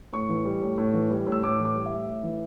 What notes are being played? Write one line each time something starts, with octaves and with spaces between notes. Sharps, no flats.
A2 C#6
E3
G3
A2
A2
E3
G3
A2
E6
A2 D6
E3
D6
G3
E5
A2
A2
E3